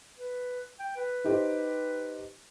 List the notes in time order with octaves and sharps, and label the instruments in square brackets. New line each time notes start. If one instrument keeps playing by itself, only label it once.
[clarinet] B4
G5
B4
[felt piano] D#4 G4 C5